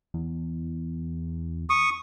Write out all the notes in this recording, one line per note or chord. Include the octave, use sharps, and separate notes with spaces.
E2
C#6 D#6